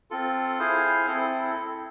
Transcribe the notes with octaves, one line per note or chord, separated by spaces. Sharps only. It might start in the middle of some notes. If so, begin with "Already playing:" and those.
C4 F4 A4
E4 G#4 C5 F5 G#5
C4 E4 A4